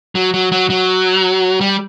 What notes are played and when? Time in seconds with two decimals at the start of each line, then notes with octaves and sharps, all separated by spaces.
0.15 F#3
0.34 F#3
0.52 F#3
0.70 F#3
1.61 G3